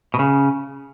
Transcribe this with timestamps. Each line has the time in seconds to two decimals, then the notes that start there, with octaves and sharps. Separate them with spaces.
0.14 B2
0.19 C#3